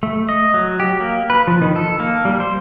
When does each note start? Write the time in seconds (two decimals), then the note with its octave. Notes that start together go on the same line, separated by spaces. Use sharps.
0.03 A3
0.29 D#5
0.54 F#3
0.80 G4
1.00 A#3
1.30 B4
1.47 F3
1.62 D#3
1.76 A4
2.00 A#3
2.25 G3
2.40 C5